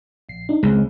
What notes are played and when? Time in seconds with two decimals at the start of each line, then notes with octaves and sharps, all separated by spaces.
0.29 A#1 C7
0.49 D4 D#4
0.63 C#2 G#3 C4